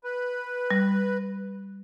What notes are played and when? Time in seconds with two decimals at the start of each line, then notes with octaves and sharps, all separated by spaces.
0.04 B4
0.71 G3